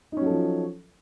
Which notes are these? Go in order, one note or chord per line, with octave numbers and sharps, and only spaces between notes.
F3 F#3 C#4 D#4 A4